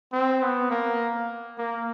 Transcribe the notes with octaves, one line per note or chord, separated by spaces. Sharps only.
C4
B3
A#3
A#3